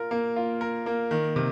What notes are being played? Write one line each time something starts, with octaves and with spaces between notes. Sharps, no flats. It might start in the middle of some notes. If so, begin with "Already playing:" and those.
Already playing: F4 A#4
A#3
F4
A#4
A#3
D#3
C3